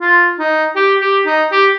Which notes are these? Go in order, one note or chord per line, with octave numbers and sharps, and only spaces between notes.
F4
D#4
G4
G4
D#4
G4